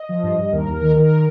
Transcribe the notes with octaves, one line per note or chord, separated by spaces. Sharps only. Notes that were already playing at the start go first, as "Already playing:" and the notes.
Already playing: D#5
F3
G2
G2
D#2 A#4
D#2
A#4
D#3
D#3 A#4